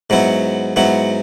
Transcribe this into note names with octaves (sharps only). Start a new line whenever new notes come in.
G#2 F#3 B3 E4
G#2 F#3 B3 E4